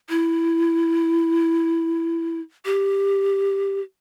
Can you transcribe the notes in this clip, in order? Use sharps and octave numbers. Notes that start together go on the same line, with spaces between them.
E4
G4